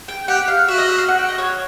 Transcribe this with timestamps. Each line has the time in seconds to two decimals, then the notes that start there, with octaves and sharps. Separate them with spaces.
0.08 G5
0.28 G4 F#5
0.48 F5
0.68 F#4 E5
0.78 D#5
0.89 E5
0.98 F5
1.08 F#5
1.18 G5
1.28 D#5
1.38 C#5